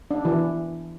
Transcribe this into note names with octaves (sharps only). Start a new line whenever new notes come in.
D4
E3